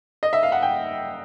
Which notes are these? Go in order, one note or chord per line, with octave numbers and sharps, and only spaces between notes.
D#5
E5
F5
F#5
G5